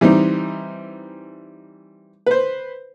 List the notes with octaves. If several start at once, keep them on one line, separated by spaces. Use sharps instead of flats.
E3 G3 C4 D#4
B4 C5